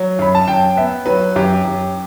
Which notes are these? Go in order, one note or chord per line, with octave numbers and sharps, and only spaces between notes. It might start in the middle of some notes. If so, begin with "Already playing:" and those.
Already playing: F#3
F#2 B5
A5
F#2 G5
B3 E5
F#3 B4
F#2 G4
F#2